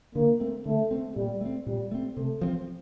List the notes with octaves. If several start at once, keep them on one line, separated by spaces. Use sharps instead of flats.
D3 A#3
A3 C4
D3 A3
A3 C4
A#2 G3
A3 C4
A#2 G3
A3 C4
C3 A3
F3 C4